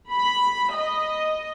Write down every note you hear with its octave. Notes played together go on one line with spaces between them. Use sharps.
B5
D#5